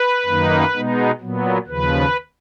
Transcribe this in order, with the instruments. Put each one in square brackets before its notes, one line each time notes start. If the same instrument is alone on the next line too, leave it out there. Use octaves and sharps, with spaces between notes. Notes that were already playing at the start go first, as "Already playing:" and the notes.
Already playing: [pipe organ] B4
F#2 D#3 A#3 D#4
B2 G#3 B3 D#4
A#2 F#3 B3
D#2 C#3 F3 B4